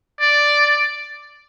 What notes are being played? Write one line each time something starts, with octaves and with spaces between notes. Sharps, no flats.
D5